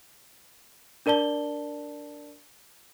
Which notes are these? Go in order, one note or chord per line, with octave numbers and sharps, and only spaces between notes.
D4 A#4 D5 A5 G7